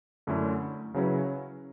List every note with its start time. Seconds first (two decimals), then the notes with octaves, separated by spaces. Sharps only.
0.27 F#2 D3 A3 C#4 E4
0.94 C#3 F#3 C#4 E4 B4